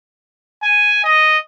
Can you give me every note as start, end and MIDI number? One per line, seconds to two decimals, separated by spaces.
0.63 1.03 80
1.04 1.38 75